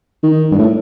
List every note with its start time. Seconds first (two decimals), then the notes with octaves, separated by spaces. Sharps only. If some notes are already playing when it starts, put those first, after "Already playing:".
0.23 D#3
0.52 G2
0.59 A2